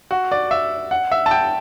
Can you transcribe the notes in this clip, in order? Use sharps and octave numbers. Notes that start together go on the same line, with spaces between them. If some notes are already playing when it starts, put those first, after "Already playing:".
F#4
D5
E5
F#5
E5
A5
G5